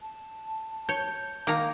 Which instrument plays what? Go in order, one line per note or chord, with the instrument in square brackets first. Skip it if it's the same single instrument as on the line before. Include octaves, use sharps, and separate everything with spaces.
[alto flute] A5
[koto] C#5 [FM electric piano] G6
[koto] D#3 A#5 [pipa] A#3